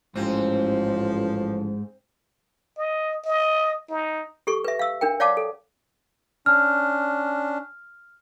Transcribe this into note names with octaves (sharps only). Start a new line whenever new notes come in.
A1 G#2 F3 C4
D#5
D#5
D#4
G4 A4 C#6
B4 E5
F5 E6
D4 A#4 G5
C#5 D5 F5 F#5 A5 D6
A4
C#4 D4 F6